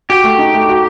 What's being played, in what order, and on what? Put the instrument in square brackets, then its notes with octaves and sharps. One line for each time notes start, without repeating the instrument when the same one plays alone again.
[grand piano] F#4 [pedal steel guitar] G4
[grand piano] A3
D#4
A3
F#4